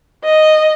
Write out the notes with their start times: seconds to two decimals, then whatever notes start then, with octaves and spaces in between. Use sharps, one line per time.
0.24 D#5